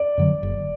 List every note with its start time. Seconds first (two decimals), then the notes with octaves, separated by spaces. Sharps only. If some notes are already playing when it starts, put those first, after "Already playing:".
Already playing: D5
0.17 F#2 D3 F#3
0.43 F#1